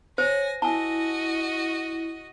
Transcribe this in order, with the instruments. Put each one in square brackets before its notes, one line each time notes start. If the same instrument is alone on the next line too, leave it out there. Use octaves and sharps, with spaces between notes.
[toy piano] C5 [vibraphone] C#5 [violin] G#5 A#6
[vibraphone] E4 [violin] F#4 D#5 [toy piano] G#5 A5